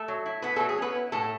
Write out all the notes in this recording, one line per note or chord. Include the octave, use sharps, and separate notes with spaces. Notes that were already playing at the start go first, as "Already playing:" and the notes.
Already playing: A3 A4
F#3
E4
B3 E4 B4
F#3 A3 A4
G#4
B3 C#4 B4
E4
A2 A3 A4